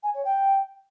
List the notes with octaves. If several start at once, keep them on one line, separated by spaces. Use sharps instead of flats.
G#5
C#5
G5